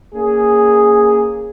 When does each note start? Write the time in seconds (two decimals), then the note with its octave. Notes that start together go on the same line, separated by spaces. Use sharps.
0.14 A#3 C#4 G#4